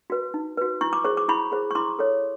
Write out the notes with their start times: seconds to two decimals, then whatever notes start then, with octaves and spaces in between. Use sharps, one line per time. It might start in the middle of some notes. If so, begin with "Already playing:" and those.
0.10 F#4 B4
0.34 D#4
0.57 F#4 B4
0.81 E4 C#6
0.93 D6
1.04 G#4 C5 C#6
1.17 D6
1.28 E4 B5 C#6
1.52 G#4 C5
1.71 C#6
1.75 E4 C6 D6
1.99 A4 C#5